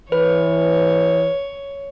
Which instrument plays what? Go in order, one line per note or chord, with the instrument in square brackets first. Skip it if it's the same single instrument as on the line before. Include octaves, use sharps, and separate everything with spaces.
[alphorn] E3 [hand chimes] B4 [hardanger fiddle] C#5